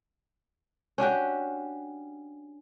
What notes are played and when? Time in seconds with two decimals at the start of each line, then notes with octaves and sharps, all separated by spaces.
0.98 C#4 D4 F#4 G4